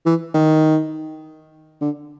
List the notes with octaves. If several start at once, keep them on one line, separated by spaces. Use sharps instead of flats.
E3
D#3
D3